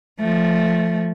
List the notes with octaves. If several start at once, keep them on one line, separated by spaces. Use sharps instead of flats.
F3 A3